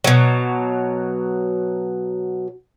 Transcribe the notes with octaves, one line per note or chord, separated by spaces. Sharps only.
B2 F#3